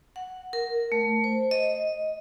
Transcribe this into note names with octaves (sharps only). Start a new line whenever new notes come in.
F#5
A#4
A3
C5
D#5